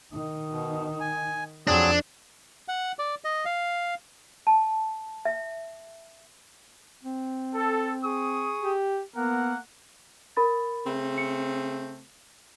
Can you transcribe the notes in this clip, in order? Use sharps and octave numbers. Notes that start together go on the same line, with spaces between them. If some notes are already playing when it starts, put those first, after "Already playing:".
D#3 D#4
B2
G#5
F2 F#3 C4 D4 G#4
F#5
D5
D#5
F5
A5
E5
C4
A4
G#4 C#6 D#6
G4
A#3 B3 A#4 F#5
A#4 B5 A6
C#3 A3 C4
C#7